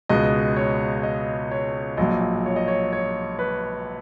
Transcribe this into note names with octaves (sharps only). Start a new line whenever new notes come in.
C#2 B2 G#3 D#5
C#5
D#5
C#5
A#1 A#2 F#3 D#5
C#5
D#5
C#5
C#5
B4